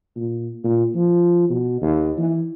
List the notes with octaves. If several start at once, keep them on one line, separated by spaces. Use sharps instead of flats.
A#2
A#2
F3
B2
D#2
E3